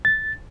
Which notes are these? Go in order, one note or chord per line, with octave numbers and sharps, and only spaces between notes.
A6